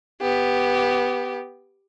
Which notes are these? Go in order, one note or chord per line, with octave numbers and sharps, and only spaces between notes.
B3 G4